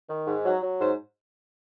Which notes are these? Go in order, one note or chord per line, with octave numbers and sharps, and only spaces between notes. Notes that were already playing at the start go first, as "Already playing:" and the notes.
D#3
G#2
F#3
F#3
G#2 C5